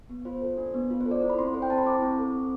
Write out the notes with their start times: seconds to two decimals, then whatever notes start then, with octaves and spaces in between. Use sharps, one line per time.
0.09 B3
0.25 F4 C5
0.41 A4
0.58 D4
0.74 B3
0.90 F4
1.01 C5
1.06 A4
1.11 D5
1.22 E4
1.30 B5
1.38 C4 C6
1.53 A4 C5
1.62 G5
1.70 C4 A5
1.78 B5
1.86 E4 D6
2.02 C4
2.18 A4
2.34 C4